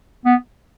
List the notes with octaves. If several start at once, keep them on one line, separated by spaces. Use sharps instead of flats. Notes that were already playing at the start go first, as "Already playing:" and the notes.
B3